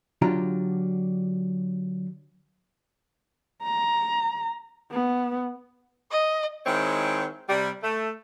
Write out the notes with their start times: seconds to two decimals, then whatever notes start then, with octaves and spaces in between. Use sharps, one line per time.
0.22 D3 F#3 D4 F4 G4 A#5
3.63 A#5
4.91 B3
6.11 D#5
6.65 D#3 G#3 C4 E4 C#5
7.48 C3 G3
7.82 A3